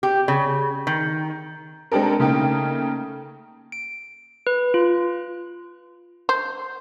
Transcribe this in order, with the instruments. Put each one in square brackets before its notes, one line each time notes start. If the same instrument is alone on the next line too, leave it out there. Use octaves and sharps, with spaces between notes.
[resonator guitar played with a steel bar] G4
C#3
D#3
[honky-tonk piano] G#3 C4 D4 G4 A4 A#4
C#3 A3 A#3 D#4 G5
[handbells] D7
B4
F4
[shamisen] C5